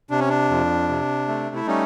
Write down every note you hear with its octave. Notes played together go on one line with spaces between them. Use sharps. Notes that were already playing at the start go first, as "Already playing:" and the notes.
C3 D4
C#4
D4
F2
C3
A3
E4
G3 C#4 D#4